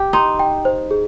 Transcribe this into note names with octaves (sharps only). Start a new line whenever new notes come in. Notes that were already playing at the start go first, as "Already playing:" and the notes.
Already playing: G4
D#4 C6
G5
C5
G#4